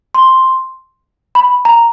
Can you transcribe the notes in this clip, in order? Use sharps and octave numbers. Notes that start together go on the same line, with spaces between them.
C6
B5
A#5